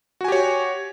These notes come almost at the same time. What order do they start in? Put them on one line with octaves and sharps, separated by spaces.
F#4 G#5 G4 C#5